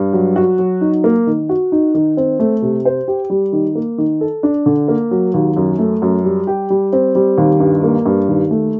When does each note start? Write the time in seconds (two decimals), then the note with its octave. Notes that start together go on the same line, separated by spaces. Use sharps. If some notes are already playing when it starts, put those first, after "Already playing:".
Already playing: G2
0.13 F#3
0.36 F#4
0.59 F#3
0.81 D#4
1.04 A#3
1.27 D#3
1.49 F#4
1.72 D#4
1.94 D#3
2.17 C4
2.40 A3
2.62 C3
2.85 C5
3.08 G4
3.30 G3
3.53 D#3
3.75 A#3
3.98 D#3
4.21 A4
4.43 D4
4.66 D3
4.88 A#3
5.11 F#3
5.34 D#2
5.56 F#2
5.79 A3
6.02 F#2
6.25 G3
6.47 G4
6.70 G3
6.93 C4
7.15 G3
7.38 D#2
7.60 G2
7.83 A#3
8.06 G2
8.28 D#2
8.51 A3